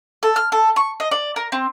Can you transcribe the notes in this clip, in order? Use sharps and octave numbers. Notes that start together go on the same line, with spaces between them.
A4
F6
A4
C#6
D#5
D5
A#4
C4